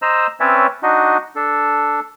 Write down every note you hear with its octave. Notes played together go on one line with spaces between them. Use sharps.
C5 D#5 A#5 E6
C4 C#4 B4 C#5 D5 E5
D4 D#4 F#4 D#5
D4 A4